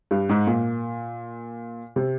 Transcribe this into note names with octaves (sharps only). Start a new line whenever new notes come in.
G2
G#2
A#2
C3